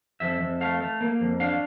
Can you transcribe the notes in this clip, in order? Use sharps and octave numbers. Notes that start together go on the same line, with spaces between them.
F2 E5
F2
A3 F5
A3
A#3
F2
D4 F5